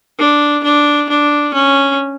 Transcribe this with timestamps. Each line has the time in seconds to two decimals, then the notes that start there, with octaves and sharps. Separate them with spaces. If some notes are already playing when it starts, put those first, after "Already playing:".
0.19 D4
0.64 D4
1.09 D4
1.54 C#4